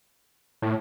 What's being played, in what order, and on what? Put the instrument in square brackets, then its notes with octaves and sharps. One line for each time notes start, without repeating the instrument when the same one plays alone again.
[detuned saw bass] A2